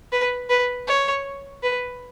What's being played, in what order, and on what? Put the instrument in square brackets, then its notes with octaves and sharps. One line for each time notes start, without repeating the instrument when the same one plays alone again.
[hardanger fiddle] B4
B4
C#5
B4